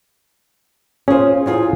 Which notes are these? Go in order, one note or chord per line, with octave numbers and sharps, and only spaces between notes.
C#4 F4 G#4 C5
E2 F4 G#4